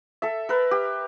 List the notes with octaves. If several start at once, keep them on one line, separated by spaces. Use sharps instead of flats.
A4 E5
A#4 B4
G4